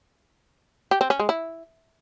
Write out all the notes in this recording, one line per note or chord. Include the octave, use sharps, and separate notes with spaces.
G4
C4
C#4
G#3
E4